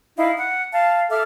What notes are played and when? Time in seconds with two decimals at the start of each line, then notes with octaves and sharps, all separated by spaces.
0.16 D#4 E4 F5
0.37 F#5
0.72 F5 A5
1.10 A4 E5 D6 F6